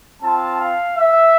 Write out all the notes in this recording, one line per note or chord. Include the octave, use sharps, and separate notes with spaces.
C4 F4 A5
F5
E5